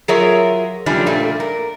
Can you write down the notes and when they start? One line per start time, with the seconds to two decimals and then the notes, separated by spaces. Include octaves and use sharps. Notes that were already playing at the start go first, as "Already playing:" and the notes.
0.08 F#3 F4 G#4 A#4 C#5 E5
0.86 C#3 F3 G3 A3 C#4 D4
1.06 A#2 G3 A3
1.40 A#4